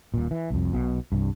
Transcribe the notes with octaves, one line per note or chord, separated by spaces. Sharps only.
D#1 A#2
E3
C2 F2
B1 B2
C2 G2